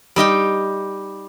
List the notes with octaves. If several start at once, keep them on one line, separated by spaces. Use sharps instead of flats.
G3 D#4 G4 G5